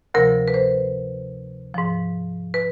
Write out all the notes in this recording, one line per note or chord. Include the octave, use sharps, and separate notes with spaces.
D2 C3 F3 A#4
B4
C5
G#2 F3
B4